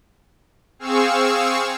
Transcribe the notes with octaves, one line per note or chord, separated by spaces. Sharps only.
C4 G#4 F5 C#6 E6